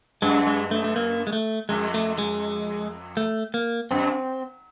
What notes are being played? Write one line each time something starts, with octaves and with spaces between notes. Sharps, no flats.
F#2 G#3
G#3
A3
A3
A#3
G#3
A3
F2 G#3
A3
G#3
A3
A#3
F#2 C4